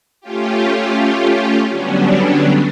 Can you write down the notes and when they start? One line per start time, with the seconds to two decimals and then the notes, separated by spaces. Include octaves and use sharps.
0.21 A3 C#4 F4 G4
1.71 D3 F#3 G3 B3 C#4 D4